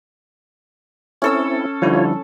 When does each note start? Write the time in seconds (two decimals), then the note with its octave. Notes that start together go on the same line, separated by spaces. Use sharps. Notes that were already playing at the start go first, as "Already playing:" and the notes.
1.22 C4 C#4 E4 A4 E6
1.82 D3 F3 G3 E4 F4 C#5